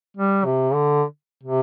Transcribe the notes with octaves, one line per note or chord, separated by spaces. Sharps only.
G3
C3
D3
C3